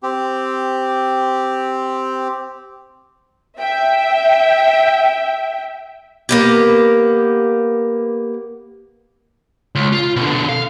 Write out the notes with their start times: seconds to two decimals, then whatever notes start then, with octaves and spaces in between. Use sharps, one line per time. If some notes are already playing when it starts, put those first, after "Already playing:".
0.03 C4 G4
3.58 E5 G5
6.29 A#3 B3 G4
9.75 C#2
9.93 F4
10.16 B2 D3
10.49 F5